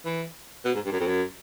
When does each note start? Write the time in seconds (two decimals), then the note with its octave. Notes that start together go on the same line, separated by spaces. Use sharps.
0.05 E3
0.65 B2
0.75 G#2
0.86 G2
0.92 F#2
1.00 F2
1.07 F#2